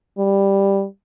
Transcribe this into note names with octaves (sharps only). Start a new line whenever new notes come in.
G3